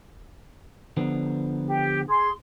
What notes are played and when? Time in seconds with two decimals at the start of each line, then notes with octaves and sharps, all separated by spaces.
0.97 D3 F3 B3
1.68 G4
2.08 G#4 C6